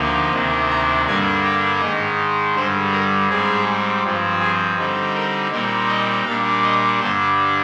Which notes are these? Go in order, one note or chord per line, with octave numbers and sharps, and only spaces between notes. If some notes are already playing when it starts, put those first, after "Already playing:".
Already playing: D2 D3 F3 A#3 D#4
D2 C3 D#3 A#3 D4
A#5
G2 D3 G3 A#3 D4 G#5
G5
G#2 D#3 G#3 D#5
G2 D3 G3 C5
A#4
G#2 G3 C4 G#4
G2 F3 C4
G#4
D3 G3 C4 D#4
A#4
A#2 G3 C4 D#4 A#4
D#5
A#2 G3 D4 F5
D#5
G2 D3 G3 D4 C5